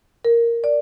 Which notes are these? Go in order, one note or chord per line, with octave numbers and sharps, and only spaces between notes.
A#4
D5